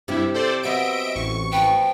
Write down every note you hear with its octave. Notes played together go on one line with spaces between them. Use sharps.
G2 C3 G3 E4 G4
A4 C5 D5
F#3 B3 C4 D#5 E5 D7
A1 C#6
F3 B4 G5